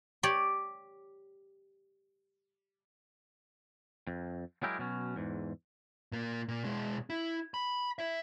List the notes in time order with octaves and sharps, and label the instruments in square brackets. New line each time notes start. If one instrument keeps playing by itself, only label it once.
[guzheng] G4 C#5 D5
[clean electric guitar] F2
F#3 G#3 E4 G4 G#4 A#4
B2 F#3 C#4
E2 G#2
[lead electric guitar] A#2 A#3
A#2
B2 G#3
E4
B5
E4 E5